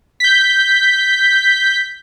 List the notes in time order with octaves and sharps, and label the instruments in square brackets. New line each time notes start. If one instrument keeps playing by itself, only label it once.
[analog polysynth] G6 B6